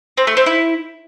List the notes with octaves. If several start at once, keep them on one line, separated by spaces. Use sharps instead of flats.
C4
A3
C4
E4